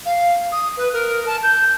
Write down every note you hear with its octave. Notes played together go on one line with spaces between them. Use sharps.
F5
D#6
B4
A#4
A5
G6